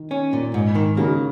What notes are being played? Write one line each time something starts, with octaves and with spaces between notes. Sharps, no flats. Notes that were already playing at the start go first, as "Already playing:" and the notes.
Already playing: D#3
C#4
A#2
G#2
D#3
C#3 A#3